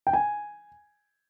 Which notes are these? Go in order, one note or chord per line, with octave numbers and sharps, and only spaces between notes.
G5
G#5